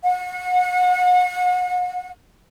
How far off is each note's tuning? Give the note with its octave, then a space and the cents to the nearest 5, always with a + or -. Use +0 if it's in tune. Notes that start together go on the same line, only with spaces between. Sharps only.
F#5 -35